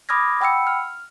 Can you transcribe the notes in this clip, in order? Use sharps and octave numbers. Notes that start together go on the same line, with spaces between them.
B5 D6 D#6 F6 G#6 A#6
F#5 G5 B5 E6 C#7
F6